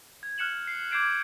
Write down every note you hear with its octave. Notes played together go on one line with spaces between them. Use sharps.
G#6
F6 F#6 C#7 E7 F#7
C7
D6 G6 G#6 C7 D7 E7